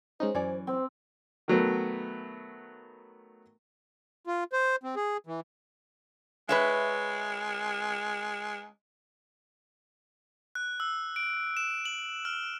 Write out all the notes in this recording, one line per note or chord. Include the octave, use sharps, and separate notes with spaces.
G#3 C#4 D#4 C5
F#2 E3 C#4 D5
C4 C5
D#3 F#3 A3 B3
F4
C5
C4
G#4
E3
G#3 B4 C#5 E5
F#6
E6
D7
E7
F#7
F6